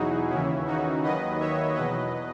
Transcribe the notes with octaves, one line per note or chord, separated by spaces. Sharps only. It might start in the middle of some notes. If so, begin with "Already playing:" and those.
Already playing: E2 B2 F#3 D#4 E4 F#4 G#4
D#2 C#3 E3 C#4 E4
D#4 F#4
D#2 D#3 F#3 B4 D#5
C#5 E5
E2 B2 F#3 B4 D#5